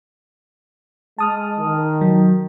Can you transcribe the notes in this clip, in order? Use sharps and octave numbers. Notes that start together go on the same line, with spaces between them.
G#3 A5 D#6 F6
D#3
F#3